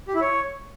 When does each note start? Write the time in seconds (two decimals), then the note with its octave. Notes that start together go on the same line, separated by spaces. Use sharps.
0.08 G4
0.15 E4
0.21 C#5